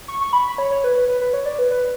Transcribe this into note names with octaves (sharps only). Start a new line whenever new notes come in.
C#6
C#6
B5
B5
C#5
C#5
B4
B4
B4
B4
C#5
D5
B4
B4